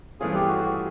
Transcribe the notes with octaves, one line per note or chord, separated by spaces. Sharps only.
G2 E3 A3 C#4 F4 G#4
G4
F#4